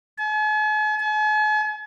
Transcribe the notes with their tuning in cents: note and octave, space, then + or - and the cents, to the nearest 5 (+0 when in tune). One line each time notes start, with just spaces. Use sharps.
G#5 +45
G#5 +45